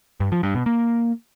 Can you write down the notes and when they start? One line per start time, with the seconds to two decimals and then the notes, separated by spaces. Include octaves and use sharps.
0.20 G2
0.32 F3
0.43 G2
0.55 B2
0.66 A#3